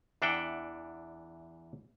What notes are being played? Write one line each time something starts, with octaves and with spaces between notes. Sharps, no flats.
E2 E3 D4 E5 F#5 G5